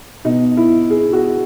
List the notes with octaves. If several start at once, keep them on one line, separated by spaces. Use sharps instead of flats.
B2 D#4
E4
G#4
F#4